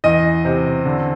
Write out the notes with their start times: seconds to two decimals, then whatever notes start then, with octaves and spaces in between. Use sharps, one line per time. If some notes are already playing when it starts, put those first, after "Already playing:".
0.04 E2 D#5
0.45 C3
0.85 D3